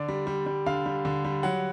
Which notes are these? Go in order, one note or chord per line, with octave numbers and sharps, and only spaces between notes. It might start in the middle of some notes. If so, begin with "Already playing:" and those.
Already playing: D3 D5
G3
G3
G3
D3 F5
G3
D3
G3
F#3 F#5